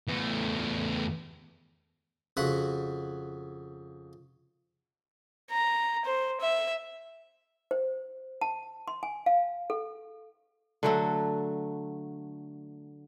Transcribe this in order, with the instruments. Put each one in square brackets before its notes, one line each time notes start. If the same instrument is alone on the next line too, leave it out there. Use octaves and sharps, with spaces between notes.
[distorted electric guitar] E2 A3
[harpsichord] F2 C#3 F#4 F#5 B5
[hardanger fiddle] A#5
C5
E5
[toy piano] C5
A5
C6
G#5
F5
A4
[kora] D3 F#3 A3